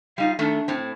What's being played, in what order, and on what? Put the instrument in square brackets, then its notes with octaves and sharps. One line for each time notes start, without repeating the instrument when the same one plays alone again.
[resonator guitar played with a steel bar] G3 D#4 F4 [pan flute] F5
[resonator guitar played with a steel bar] D#3 A3 [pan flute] D4
[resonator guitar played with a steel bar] A2 C4